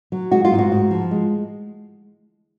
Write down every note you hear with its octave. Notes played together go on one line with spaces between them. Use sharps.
F#3
G#3 F#4
F4
G#2
F#4
G#2
F3
G#3